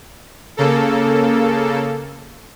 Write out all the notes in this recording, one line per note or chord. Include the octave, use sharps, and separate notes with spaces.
C#3 A#3 A4